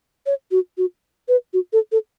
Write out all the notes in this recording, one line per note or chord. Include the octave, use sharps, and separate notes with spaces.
C#5
F#4
F#4
B4
F#4
A4
A4